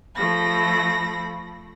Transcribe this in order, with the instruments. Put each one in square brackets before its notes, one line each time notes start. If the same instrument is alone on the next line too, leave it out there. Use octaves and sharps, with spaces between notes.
[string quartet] F3 A3 B5 A#6